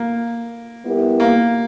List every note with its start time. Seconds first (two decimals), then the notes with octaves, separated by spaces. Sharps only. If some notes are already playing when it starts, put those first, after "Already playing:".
Already playing: A#3
0.84 G3 B3 E4 G4 A#4
1.20 A#3